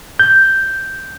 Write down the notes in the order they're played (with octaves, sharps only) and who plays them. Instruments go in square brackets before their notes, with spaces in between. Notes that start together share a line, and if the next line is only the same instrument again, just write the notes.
[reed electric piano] G6